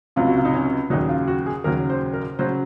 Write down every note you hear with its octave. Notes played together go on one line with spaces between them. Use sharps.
C#2 C3 F#3 F4
F#4
F4
D#4
C#4
D#2 C#3 F#3 D#4
F4
F#4
G#4
D#2 C#3 F#3 A#4
C5
A#4
C#3 F#3 C5